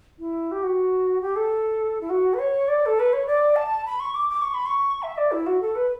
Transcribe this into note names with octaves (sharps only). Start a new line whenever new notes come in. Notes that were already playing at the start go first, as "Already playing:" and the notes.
E4
G4
F#4
G4
A4
E4
F#4
B4
C#5
D5
A4
B4
C#5
D5
A5
B5
C#6
D6
D6
C#6
B5
C#6
E5
D5
E4
F#4
A4
B4